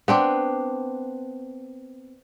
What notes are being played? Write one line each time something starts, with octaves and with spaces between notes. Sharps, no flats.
B3 C4 D4